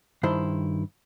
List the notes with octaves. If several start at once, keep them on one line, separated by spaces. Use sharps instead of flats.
G2 D#3 E4 C5 C6